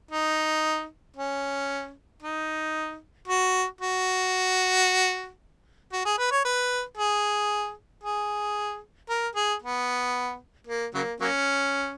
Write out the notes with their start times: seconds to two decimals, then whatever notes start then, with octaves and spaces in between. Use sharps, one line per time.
0.11 D#4
1.16 C#4
2.22 D#4
3.28 F#4
3.81 F#4
5.92 F#4
6.05 G#4
6.18 B4
6.32 C#5
6.45 B4
6.98 G#4
8.04 G#4
9.09 A#4
9.35 G#4
9.62 B3
10.67 A#3
10.94 C#3 F#3 A#3
11.21 F#3 A#3 C#4